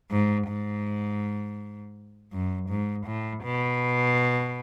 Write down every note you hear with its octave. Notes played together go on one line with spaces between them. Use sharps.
G#2
G#2
F#2
G#2
A2
B2